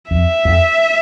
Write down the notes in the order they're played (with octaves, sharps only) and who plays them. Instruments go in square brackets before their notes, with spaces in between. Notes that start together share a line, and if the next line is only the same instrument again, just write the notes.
[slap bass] F2 [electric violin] E5
[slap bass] F2